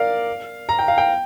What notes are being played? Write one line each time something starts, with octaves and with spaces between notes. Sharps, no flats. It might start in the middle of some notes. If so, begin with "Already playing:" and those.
Already playing: A#4 D5 F5
A#5
G5
F5
G5